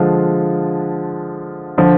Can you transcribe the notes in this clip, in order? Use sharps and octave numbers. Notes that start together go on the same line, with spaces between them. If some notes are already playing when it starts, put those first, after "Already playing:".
Already playing: D3 F3 G#3 D4 F4
D3 F3